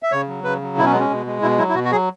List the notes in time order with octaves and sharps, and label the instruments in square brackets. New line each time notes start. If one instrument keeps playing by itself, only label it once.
[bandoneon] E5
C#3 C#5
F#3
C#3 B4
F#3
B2 E4
C#4
G#3 B3
C#4
B2
G#3
B2 E4
F#3 E4
E4
B2 F#4
F#4
F#3 G#4